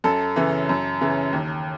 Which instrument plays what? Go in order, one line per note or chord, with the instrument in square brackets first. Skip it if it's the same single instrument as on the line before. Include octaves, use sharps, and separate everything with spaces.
[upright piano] F#2 A4
C#3 E3
F#2
C#3 E3
D#2